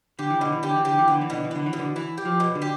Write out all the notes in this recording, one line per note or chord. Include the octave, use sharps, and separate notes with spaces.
D3 G4
E3
B2 D3
E3
D3 G4
E3
D3 G4
E3
D3 B3
E3
B2 D3
E3
D3 B3
E3
B2
D3
E3 E4
G4
F3
B2
D3
G4